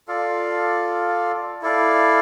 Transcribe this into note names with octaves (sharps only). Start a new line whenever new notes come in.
F4 A4 D5 F5
E4 A4 D5 F5